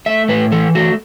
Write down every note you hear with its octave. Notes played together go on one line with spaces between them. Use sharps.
A3 E5
A2 B4
E3 A4
A3 F#4